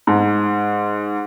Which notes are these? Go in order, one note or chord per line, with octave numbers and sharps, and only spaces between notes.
G#2